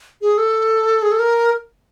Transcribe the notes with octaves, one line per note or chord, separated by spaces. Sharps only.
G#4
A4
G#4
A4
A#4